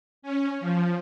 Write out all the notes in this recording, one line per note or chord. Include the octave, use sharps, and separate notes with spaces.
C#4
F3